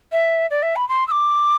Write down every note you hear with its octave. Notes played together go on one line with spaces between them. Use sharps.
E5
D5
E5
B5
C6
E6
D6